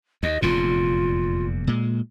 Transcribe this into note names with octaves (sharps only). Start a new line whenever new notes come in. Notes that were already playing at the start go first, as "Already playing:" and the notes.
D#2 D#5
F1 E2 A#2 F4
A#2 G#3